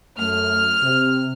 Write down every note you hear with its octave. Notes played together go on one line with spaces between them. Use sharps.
F#2 A3 F6
C3